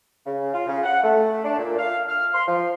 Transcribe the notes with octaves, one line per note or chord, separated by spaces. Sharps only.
C#3
F4
C#3
F#5
A3
D4
A#2
F5
F6
C6
F3